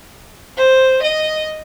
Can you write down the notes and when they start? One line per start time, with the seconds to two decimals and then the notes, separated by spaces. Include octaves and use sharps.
0.57 C5
1.03 D#5